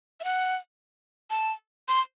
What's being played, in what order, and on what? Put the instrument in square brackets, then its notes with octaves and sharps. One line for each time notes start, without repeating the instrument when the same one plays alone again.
[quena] E5
F#5
A5
C6